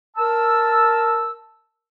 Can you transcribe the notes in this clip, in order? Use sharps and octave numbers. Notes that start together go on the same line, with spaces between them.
A#4 A5 E6